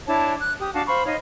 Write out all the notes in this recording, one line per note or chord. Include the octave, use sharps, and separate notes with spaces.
D4 E4 C#5 A5
F#6
G4 D#6
D4 F#4 F5 A5
C5 F5 B5 C#6
D#4 C#5 D#5 F5